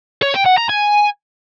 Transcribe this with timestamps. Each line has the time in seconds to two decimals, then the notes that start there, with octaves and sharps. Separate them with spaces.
0.23 C#5
0.34 G5
0.46 F#5
0.58 A#5
0.70 G#5